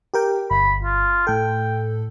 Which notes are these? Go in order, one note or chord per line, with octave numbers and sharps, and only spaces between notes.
G4 A#4 G5
G1 B5
F4
A2 A4 G5